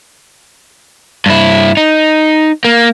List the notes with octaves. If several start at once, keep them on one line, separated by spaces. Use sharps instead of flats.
G2 E4
D#4
A#3